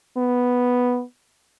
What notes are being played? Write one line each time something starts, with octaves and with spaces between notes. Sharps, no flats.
B3